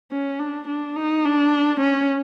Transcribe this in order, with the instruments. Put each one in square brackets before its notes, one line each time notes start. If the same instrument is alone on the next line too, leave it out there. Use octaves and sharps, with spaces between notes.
[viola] C#4
D4
D4
D#4
D4
C#4